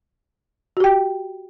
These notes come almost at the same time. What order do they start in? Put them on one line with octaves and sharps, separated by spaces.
F#4 G4 G5